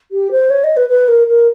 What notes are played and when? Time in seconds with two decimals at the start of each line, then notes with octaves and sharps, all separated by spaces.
0.12 G4
0.31 C5
0.50 C#5
0.64 D#5
0.77 B4
0.89 B4
1.08 A#4
1.27 A#4